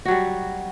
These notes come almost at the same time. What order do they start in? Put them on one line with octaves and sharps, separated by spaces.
F#4 F#3 G3